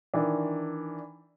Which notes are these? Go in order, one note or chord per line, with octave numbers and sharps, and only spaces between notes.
D#3 E3 D4